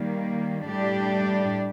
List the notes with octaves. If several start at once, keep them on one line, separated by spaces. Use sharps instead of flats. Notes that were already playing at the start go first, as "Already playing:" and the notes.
Already playing: D#3 G3 A#3
A2 G3 D4 G4